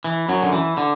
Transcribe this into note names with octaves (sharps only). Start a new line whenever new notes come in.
E3
F#2 F#3
D3
E3
D3